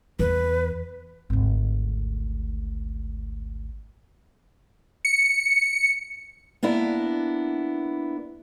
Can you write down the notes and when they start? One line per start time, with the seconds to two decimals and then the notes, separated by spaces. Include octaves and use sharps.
0.19 E2 B4
1.30 G#1 D2
5.05 C#7
6.63 A#3 B3 D4 E4